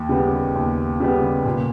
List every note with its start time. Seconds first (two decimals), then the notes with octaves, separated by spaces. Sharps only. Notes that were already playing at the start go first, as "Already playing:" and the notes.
Already playing: D#2
0.09 C#3 G3 B3
0.55 D#2
1.00 C#3 G3 B3
1.45 A#2